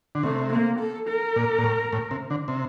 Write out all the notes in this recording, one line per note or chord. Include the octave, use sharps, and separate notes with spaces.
D3
C3 A3
A#3
A4
A#4
A#2
A#2
A2
A2
C3
D3
C3